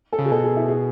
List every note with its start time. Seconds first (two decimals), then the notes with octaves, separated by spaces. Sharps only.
0.13 A4
0.19 C#3
0.26 G#4
0.31 B2 A4
0.44 G#4
0.56 E4
0.68 G#4